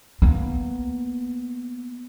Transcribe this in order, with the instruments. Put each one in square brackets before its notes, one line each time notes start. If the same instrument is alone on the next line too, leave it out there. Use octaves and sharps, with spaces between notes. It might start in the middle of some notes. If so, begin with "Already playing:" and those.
[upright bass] A#3 B3